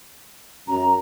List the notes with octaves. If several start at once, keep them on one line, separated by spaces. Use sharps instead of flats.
F#2 A#5